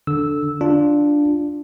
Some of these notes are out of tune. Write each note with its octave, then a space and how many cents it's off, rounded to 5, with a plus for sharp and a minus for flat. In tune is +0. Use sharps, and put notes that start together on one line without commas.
D3 +0 E6 -10
D4 +0 F4 +0